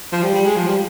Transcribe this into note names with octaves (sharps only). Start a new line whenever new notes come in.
F3
G3
G3
G#3
F3
G3